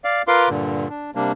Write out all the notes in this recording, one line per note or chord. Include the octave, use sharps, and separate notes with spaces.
D5 F5
F4 A#4 B4 F5 C6 D6
G2 A#2 D3
D4
C3 G3 A#3 D4